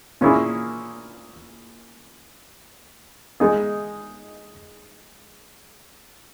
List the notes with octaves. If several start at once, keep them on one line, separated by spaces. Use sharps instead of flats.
A#2 A#3 C#4 E4 G#4
G#3 D#4 G#4